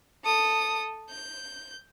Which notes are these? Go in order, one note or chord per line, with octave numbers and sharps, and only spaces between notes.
A4 D#6
G6